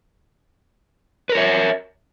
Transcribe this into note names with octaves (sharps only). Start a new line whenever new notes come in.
A#4 B4 C#5 E5